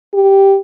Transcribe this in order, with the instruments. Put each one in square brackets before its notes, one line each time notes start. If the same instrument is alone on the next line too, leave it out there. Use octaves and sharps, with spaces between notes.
[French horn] G4